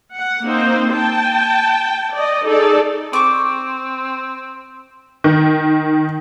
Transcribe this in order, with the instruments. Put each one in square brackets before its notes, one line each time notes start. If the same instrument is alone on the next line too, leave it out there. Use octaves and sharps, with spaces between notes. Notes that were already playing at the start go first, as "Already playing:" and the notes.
[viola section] F#5
A#3 C4 D#4 C5
G5 A5
D5 D#5
D#4 G#4 A4 D5
[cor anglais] C4 [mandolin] C#6 D6
[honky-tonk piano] D#3